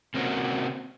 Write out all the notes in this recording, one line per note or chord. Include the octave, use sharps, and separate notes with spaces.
C3 A#3 C4 C#4 F#4